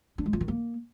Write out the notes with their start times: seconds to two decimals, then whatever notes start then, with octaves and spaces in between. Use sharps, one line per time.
0.18 D4
0.26 G#3
0.33 F4
0.41 D#3
0.48 A#3